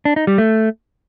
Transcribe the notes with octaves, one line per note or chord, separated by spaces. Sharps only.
D4
D#4
G3
A3